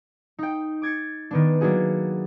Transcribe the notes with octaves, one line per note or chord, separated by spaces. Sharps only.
D#4 G5
D6 G#6 A6 C#7
D#3 B3 D4
F#3 A#3 D4 E4 F#4 G#4